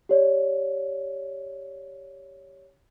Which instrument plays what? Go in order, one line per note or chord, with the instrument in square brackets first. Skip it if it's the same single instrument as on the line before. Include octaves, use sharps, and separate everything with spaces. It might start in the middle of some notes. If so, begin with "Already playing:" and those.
[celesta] G4 C#5 D5